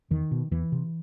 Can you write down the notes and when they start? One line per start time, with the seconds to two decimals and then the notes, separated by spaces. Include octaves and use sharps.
0.11 E2 D#3
0.31 B2
0.51 E2 E3
0.72 C3